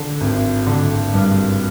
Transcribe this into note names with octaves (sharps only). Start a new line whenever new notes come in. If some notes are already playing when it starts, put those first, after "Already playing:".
Already playing: D3
G#1
D3
G2